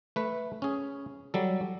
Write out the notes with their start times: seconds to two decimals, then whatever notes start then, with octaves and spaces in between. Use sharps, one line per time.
0.16 A3 B4
0.62 C#4 G#4
1.34 F#3 G3 A4